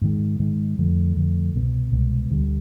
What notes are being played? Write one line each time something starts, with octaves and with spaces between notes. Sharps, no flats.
G#2 D#3 G#3
G#2 D#3 G#3
F2 D3 F3 A3
F2 D3 F3 A3
C2 B2 G#3 B3
C2 B2 G#3 B3
D2 D3 G3